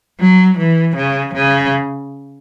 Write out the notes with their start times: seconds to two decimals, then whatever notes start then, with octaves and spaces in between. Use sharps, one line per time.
0.20 F#3
0.58 E3
0.96 C#3
1.34 C#3